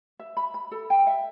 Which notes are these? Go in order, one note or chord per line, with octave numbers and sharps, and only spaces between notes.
E5
B5
B5
A4
G5
E5